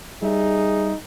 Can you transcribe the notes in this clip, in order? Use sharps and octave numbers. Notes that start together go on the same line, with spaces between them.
G3 D#4 G#4 E5